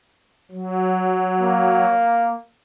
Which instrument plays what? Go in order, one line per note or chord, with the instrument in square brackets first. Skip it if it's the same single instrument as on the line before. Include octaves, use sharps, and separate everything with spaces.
[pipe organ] F#3
[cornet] A#3